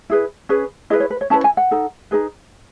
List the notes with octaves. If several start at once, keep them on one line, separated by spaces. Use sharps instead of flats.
E4 G#4 B4
C#4 G#4 B4
E4 G#4 B4 D#5
C#5
B4
C#5
C#4 E4 B4 A5
G#5
F#5
D#4 A4
D#4 G#4 B4